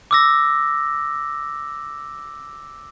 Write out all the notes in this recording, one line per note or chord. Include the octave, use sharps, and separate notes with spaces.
D6 E6 A#6